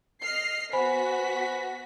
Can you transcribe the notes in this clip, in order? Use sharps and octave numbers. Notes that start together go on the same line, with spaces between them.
D#5 F6 C7
B3 F#4 C5 G#5 B5 B6